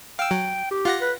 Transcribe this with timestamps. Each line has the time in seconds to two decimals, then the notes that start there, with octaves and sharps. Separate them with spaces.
0.19 F5 G5 E6
0.31 F#3
0.71 G4
0.85 F4 F#5 A#6
1.01 B4